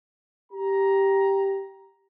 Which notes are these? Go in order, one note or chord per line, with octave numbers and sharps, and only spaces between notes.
G4 A#5